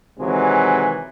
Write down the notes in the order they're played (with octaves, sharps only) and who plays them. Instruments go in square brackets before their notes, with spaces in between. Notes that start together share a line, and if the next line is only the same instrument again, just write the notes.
[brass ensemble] C3 D#3 E3 F#3 G#3